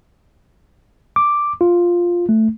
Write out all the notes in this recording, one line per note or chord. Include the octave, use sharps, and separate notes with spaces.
D6
F4
A3